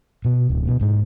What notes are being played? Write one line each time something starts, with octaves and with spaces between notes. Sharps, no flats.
B2
D1
B2
G#2